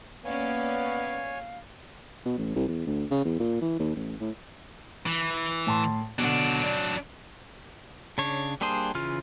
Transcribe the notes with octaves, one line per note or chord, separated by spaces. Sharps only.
A#3 B3 C#4 C#5 D5 F5 G#5
B2
A1
C2
E2
D2
C#3
E2
A#2
E3
D#2
A1
A2
E3
A2 A5 C6
B2 D3 F#3 D4
D5 D7
C#3 D4 C#5
G3 A#3 D4 G#4 C5
C#3 E3 F4 F6